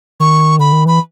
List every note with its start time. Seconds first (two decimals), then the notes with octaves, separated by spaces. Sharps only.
0.20 D#3 C#6
0.59 D3 B5
0.72 D#3
0.86 E3 B5